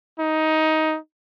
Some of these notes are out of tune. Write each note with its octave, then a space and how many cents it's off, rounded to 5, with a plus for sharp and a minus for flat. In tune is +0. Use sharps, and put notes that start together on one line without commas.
D#4 +15